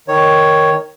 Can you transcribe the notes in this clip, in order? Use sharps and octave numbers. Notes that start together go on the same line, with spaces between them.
D#3 C#5